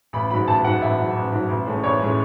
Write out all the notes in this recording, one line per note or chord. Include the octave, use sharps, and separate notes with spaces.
A1 B5
G#2 F#3 B5
A1 A5
G#2 F#3 F#5
A1 E5
G#2 F#3
A1
G#2 F#3
A1
A2 G#3 C#4
A1 C#5
A2 G#3 C#4